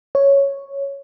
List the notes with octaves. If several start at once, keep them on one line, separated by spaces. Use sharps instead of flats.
C#5